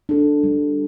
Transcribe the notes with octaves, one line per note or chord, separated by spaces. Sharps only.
D4 A4
G3